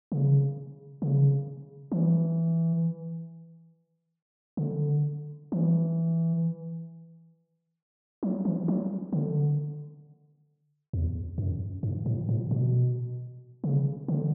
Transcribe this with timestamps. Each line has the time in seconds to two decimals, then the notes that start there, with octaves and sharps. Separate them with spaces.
0.12 C#3
1.02 C#3
1.92 E3
4.57 C#3
4.62 D3
5.52 E3
8.23 F#3
8.45 E3
8.68 F#3
9.13 D3
10.93 E2
11.38 F#2
11.83 G2
12.06 A2
12.29 A2
12.51 B2
13.64 C#3
14.08 D3